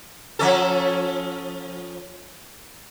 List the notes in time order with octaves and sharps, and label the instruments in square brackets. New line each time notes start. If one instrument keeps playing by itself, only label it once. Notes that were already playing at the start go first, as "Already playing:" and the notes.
[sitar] F3 C#4 A4